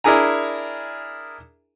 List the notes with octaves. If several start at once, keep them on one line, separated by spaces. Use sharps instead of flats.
D4 E4 G#4 A#4 G#5 A#5